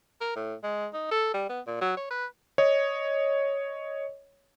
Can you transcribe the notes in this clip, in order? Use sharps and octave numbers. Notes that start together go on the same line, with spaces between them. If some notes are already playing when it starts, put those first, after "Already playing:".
A#4
A2
G#3
D#4
A4
G3
B3
A#2
F#3
C#5
B4
C#5 D#5